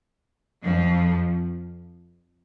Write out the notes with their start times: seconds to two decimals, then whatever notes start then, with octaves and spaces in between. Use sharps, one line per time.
0.64 F2 F3